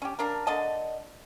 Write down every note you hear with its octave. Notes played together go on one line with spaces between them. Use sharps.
C#4 G4
A#3 D4 A#4
D3 A#3 D#5 A5